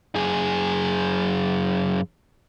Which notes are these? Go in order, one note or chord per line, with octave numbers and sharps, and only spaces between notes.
F#2 G#4